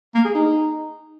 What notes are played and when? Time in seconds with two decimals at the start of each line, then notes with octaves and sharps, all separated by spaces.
0.15 A#3
0.25 G#4
0.35 D#4